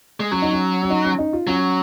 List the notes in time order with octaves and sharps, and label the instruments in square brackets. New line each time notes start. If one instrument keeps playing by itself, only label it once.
[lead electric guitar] G#3
[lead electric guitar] F#3 [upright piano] C#4
[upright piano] D#4
C#4
C#4
D#4
C#4
D#4
F4
[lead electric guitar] F#3 [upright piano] C#4